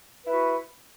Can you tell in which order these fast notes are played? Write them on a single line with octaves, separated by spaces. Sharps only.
B4 E4 F#4